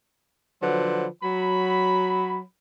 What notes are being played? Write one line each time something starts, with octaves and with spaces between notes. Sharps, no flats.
D3 F3 F#3 B4 C5
F#3 B5